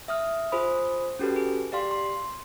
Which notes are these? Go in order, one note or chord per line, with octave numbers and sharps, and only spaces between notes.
E5 D#6 F6
F4 G#4 C5 B5 D#6
C#4 F#4 G4 A4 B4
G#4
G4 D5 F5 C6
C6